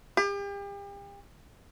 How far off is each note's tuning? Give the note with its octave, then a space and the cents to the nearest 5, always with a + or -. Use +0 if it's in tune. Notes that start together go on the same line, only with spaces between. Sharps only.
G4 +40